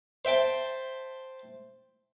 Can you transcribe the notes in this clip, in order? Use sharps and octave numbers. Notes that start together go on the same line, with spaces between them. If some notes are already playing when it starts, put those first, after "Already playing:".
C5 E5 G5 A5